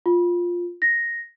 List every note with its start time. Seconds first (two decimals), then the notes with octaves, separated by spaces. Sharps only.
0.06 F4
0.82 A#6